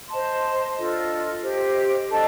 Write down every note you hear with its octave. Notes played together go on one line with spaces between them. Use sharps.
C5 D#5 A5 C6
D4 F4 A4 D#5
G4 C5 D#5
D4 A4 D#5 A5